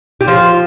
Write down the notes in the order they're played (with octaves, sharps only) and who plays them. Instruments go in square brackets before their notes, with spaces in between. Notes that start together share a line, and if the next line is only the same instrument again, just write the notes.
[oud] G3
[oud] F3 [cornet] F4